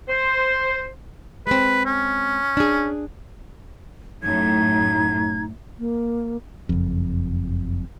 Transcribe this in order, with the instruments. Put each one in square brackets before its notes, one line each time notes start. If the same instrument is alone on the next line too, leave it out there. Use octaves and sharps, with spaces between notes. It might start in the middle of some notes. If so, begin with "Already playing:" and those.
[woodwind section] C5
[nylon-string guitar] G#3 C4 [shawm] B4
[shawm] C#4
[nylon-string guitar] D4 G#4
[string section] F#2 A2 [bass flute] D#4 [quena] G#6
[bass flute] A#3
[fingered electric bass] F#1 F2